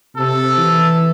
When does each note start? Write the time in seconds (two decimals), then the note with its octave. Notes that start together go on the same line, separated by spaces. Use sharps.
0.17 C3 A4
0.57 E3